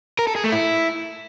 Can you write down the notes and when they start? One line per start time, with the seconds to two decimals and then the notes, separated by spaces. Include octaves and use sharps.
0.19 A#4
0.27 A4
0.35 G#4
0.44 A3
0.52 E4